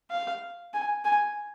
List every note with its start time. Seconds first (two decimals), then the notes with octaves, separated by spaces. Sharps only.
0.11 F5
0.74 G#5
1.05 G#5